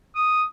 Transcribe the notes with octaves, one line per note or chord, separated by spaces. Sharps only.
D#6